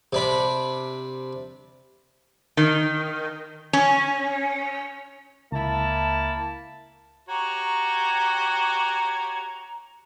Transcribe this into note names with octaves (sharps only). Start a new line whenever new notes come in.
C3 D4 B5
D#3
C#4
C#2 A#3 E4 A5
F#4 G4 C#5 A#5